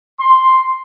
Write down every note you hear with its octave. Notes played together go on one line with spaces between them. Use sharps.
C6